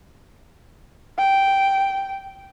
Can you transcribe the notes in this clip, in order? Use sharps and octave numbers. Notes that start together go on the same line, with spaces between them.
G5